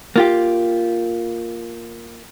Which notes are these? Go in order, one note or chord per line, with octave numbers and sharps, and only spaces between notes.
A#3 F4 G4